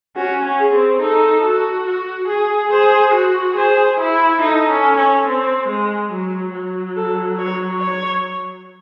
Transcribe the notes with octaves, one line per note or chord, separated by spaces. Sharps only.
C#4 F#4
C#4
G#4
C4
D#4 A4
F#4
F#4
G#4
G#4 C5
F#4
G#4 C5
E4
D#4 A4
C#4
C#4
C4
G#3
F#3
F#3
A4
C#5
C#5